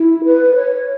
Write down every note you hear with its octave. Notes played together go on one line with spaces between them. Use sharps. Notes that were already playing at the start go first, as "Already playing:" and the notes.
Already playing: E4
B4
C#5